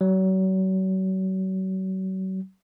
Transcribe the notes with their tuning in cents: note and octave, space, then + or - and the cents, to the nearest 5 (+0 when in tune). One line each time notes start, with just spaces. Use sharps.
F#3 +35